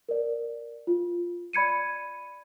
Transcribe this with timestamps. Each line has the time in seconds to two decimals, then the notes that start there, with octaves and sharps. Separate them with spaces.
0.09 A#4 D5
0.87 F4
1.53 D5 B5 G#6 C#7 D#7